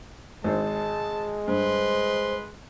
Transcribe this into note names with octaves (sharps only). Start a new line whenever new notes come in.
G#1 G#3 C5 A5
G2 B4 C5 D#5 C6